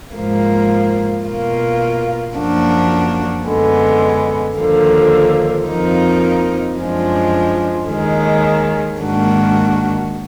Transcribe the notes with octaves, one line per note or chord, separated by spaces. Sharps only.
G#2 F3 A#3
B2 A#3 F4
F#2 F3 A#3 D4 F#4
F#2 D3 G#3 B3
D#2 D3 F3 A#3
F2 F3 A#3 D#4
F#2 F3 G#3 D4
D#2 D#3 G#3
G#2 D#3 A#3 D4 F#4